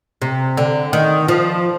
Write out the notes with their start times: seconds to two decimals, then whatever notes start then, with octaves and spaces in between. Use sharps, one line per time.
0.22 C3
0.57 D3
0.93 D#3
1.28 F3